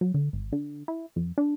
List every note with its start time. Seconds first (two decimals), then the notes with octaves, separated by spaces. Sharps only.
0.01 F#3
0.14 D3
0.33 G#1
0.52 D3
0.88 E4
1.16 F2
1.38 D4